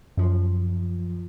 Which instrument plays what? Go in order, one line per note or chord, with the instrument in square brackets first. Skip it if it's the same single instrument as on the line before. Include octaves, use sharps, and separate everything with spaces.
[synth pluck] F#2 F3